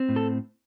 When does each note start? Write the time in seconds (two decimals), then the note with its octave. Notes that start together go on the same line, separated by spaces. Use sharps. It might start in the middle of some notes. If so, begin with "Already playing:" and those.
Already playing: C4
0.09 A2
0.16 A4